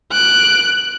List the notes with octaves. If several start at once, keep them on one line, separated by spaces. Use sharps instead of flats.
F#6 D7